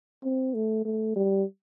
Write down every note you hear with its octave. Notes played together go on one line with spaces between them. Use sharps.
C4
A3
A3
G3